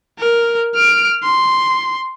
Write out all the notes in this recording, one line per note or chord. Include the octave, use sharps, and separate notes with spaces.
A#4
F6 D7
C6